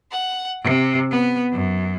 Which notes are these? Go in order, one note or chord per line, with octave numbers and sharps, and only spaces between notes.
F#5
C3
B3
F#2